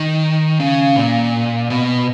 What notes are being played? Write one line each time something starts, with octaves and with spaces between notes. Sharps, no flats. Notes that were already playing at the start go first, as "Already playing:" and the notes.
Already playing: D#3
C#3
A#2
B2